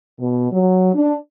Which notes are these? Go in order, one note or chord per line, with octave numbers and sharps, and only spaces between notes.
B2
F#3
D4